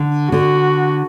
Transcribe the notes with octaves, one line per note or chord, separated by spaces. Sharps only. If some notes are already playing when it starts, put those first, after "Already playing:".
Already playing: D3
D3 F#4